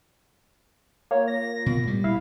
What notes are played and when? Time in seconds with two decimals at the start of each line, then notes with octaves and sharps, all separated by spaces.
1.11 A#3 F4 C#5
1.28 A#6
1.66 B2
1.87 A2 G3
2.04 B1 E4 F5